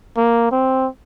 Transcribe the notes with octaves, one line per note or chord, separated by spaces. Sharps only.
A#3
C4